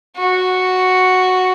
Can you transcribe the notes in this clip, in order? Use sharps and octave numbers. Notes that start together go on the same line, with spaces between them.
F#4